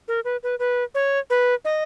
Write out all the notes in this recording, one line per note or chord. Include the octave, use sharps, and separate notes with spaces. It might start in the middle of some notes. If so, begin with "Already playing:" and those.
A#4
B4
B4
B4
C#5
B4
D#5